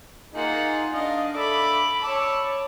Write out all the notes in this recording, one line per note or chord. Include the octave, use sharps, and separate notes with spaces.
A#3 D#4 F4 G#4 F#5
D4 D#5 F5
A4 D5 E5 B5 D6
C#5 A5 B5 D6 E6